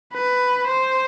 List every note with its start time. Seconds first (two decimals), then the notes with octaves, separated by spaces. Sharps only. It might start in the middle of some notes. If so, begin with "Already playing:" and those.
0.14 B4
0.68 C5